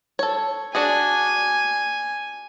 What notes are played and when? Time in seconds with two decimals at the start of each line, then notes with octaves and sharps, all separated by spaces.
0.19 A4 C#5
0.75 D4 F#4 G#4 G#5